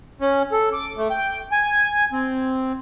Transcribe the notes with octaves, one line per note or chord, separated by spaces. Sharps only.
C#4
A4
D6
A3
G5
G#5
C4